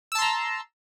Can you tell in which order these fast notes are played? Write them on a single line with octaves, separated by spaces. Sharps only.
E6 A5 C6 A#5